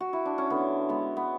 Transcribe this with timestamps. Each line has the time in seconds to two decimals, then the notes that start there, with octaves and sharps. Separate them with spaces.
0.00 F#4
0.13 E4
0.26 D4
0.38 C#4
0.50 D3 B3
0.89 G#3 B3
1.17 B3